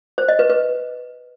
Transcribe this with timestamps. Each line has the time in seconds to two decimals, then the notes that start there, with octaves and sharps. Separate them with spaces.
0.18 C5
0.28 D#5
0.39 B4
0.50 B4